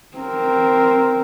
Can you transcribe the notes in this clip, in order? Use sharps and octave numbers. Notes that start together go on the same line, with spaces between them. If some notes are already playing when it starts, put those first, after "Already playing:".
C4 A#4